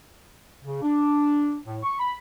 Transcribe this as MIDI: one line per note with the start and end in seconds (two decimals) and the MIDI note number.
0.64 0.80 49
0.82 1.57 62
1.66 1.77 45
1.83 1.94 85
1.99 2.15 83